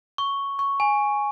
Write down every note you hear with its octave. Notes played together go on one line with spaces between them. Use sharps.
C#6
C#6
G#5